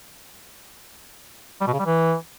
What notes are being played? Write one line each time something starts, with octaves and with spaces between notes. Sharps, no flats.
G3
B2
C#3
G3
E3